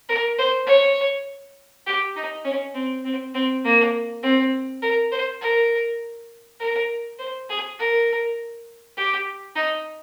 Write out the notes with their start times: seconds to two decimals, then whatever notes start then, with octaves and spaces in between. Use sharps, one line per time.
0.09 A#4
0.38 C5
0.67 C#5
1.86 G4
2.16 D#4
2.45 C#4
2.75 C4
3.05 C4
3.34 C4
3.64 A#3
4.23 C4
4.82 A#4
5.12 C5
5.41 A#4
6.60 A#4
7.19 C5
7.49 G#4
7.79 A#4
8.97 G4
9.56 D#4